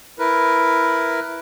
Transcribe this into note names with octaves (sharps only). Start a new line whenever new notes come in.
E4 A#4 B4